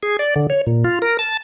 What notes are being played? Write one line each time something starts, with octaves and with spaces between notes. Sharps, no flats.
G#4
D5
D3
C#5
A#2
F4
A#4
A5